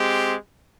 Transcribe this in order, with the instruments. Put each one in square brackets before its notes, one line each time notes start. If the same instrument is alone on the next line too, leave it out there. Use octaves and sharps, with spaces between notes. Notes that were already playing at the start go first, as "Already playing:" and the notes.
Already playing: [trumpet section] G#3 C4 G4